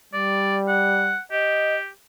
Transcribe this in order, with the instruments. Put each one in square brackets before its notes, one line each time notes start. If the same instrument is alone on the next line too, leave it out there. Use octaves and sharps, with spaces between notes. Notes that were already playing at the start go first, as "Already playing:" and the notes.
[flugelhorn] G3 [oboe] D5
[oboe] F#5
[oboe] G4 [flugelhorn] D#5